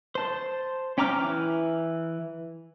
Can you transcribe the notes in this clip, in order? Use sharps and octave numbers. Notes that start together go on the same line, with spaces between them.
C5 A5
C#4 G5 A#5 D6 F6
E3